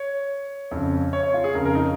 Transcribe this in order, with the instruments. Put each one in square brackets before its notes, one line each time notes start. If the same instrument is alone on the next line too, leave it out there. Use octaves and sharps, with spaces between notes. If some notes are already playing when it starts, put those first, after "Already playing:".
Already playing: [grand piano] C#5
F2 C#3
C#5
C#5
F4
G#4
F2 C#3 A#4
A#4
D#4